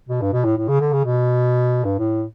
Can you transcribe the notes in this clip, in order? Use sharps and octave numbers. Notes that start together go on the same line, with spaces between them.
B2
G2
B2
A2
A2
C#3
D3
C#3
B2
G2
A2